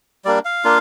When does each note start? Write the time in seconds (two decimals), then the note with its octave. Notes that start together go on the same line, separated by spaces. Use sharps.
0.25 G3 A#3 D4 D5
0.45 F5
0.64 A#3 D4 F4